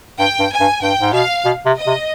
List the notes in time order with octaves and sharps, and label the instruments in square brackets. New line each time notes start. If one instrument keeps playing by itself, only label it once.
[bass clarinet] G2 [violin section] G5
[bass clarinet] G2
[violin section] G#5
[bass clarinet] G2
[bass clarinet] G2 [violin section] G5
[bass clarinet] G#2
[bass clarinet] B2 [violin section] F5
[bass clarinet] B2
C3
[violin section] D#5
[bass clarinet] C3